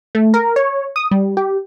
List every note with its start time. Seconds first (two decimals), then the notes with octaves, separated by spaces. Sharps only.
0.15 A3
0.34 A#4
0.56 C#5
0.96 D#6
1.11 G3
1.37 G4